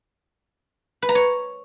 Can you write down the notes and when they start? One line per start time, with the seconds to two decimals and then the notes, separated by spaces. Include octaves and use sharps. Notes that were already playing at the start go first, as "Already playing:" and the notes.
1.02 B4
1.09 A#5
1.15 C#5